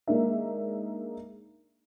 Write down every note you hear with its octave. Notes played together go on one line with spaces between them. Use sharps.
G#3 A#3 D4 D#4 E5